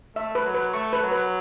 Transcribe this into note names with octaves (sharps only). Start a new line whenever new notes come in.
A3 E5
B4
F#3
B4
A3 C#6
B4
F#3
B4